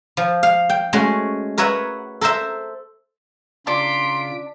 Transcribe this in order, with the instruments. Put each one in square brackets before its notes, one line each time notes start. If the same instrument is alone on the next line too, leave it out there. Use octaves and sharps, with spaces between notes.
[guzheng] F3
F5
G5
G#3 A3 C#4 F#4
A#4 B4 C#5 E5 F#5
A4 A#4 C5 E5
[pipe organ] C#3 F4 [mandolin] D4 [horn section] A#5 C6 [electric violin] B6 D7